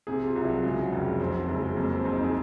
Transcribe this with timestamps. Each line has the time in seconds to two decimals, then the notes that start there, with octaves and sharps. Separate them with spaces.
0.07 C3 G#4
0.27 F4
0.36 C2
0.44 F#3
0.63 C#3 G#3
0.82 F#3
0.92 F1
1.01 G#3
1.20 F2 C4
1.34 F#3
1.48 F#1 G#3
1.62 G#3
1.76 F2 A#3
1.96 C4
2.05 F2
2.13 D#4
2.24 G#4